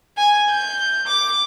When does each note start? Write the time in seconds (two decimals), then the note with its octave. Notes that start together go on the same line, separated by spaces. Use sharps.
0.18 G#5
0.49 G6
1.07 D6